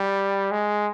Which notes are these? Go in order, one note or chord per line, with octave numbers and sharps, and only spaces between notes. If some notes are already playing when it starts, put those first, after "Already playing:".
Already playing: G3
G#3